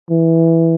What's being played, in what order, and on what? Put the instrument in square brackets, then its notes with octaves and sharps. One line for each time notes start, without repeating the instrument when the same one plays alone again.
[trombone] E3